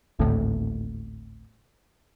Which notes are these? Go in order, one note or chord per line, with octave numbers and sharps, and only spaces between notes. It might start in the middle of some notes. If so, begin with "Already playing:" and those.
G#1 D2 A2